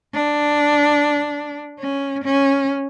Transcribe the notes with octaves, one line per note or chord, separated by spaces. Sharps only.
D4
C#4
C#4